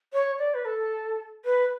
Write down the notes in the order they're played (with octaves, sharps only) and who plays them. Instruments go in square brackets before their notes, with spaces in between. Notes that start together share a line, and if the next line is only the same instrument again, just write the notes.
[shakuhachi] C#5
D5
B4
A4
B4